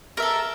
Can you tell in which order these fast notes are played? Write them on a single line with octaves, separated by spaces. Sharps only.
A#4 E5 A4